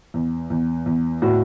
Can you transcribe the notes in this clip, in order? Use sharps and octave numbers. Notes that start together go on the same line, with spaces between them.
E2
E2
E2
A2 F#4